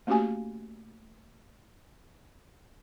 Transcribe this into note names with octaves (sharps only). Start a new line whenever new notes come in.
A3 A#3 C#4 F#4 G4 G#5